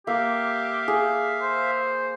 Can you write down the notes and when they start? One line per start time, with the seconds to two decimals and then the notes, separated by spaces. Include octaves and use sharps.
0.07 A#3 G4 E5 F5
0.88 G#4
1.42 C5